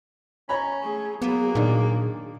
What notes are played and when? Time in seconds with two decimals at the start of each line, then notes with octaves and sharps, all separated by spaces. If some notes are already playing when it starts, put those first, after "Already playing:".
0.49 C#4 C#5 A#5 B5
0.82 A3 G#4
1.22 F#3 A#3 B3 G#4
1.55 A#2 D#3 D4